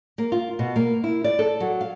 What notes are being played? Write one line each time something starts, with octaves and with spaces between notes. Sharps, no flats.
A#3
F4
B2
A#3
E4
D5
A4
F#3
F5